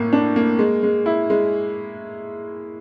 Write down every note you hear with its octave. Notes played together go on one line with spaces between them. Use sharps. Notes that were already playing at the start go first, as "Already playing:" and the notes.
Already playing: A2 A#3
D4
A#3
G#3
G#3
E4
G#3